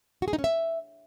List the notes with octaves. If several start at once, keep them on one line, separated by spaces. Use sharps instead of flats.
F#4
G#4
D#4
C#4
E5